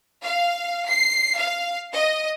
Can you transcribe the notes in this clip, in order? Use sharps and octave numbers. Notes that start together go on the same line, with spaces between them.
F5
C7
F5
D#5